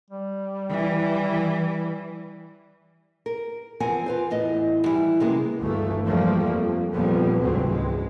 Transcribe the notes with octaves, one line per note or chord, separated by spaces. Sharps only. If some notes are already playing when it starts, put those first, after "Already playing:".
G3
E3
A#4
E2 F3 C4 A#4 F#5 G#5
F4 B4 C5
E2 A2 D#5
D#3 E3 G3 E4
C3 F#3 G#3 A#3 B3 C#4
G1 D2 E3 A3 A#3
E2 F3 G3 A3 A#3
F2
F2 A#2 F3 G3 A#3 B3
F1 D2 G#2 E3 F#3 C4
C#2 G#3